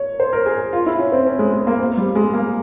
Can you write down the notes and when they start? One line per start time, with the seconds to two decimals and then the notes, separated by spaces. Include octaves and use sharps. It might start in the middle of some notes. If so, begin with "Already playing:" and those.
Already playing: C#5
0.20 C5
0.33 A#4
0.46 G#4
0.73 F4
0.86 E4
0.99 C#4
1.12 C4
1.27 C#4
1.39 G#3
1.53 G#3
1.67 A#3
1.80 C4
1.97 G3
2.15 G#3
2.34 A#3